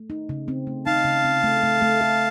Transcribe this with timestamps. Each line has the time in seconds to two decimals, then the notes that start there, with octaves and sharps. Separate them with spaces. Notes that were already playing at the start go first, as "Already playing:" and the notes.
Already playing: A3
0.10 D#4
0.29 C#3
0.48 C4
0.67 A3
0.86 D#4 F5 A5
1.05 C#3
1.25 C4
1.44 A3
1.63 A3
1.82 A3
2.01 A4